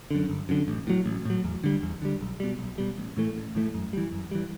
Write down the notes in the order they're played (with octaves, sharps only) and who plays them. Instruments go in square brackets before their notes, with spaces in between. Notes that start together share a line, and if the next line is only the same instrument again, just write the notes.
[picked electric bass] F#2 D3
G1
F#2 D3
A1
A2 F#3
A1
A2 F#3
E2
D3 G3
E2
D3 G3
B1
B2 G3
B1
B2 G3
A1
A2 E3 A3
A1
A2 E3 A3
F#2
E3 G3
F#2
E3 G3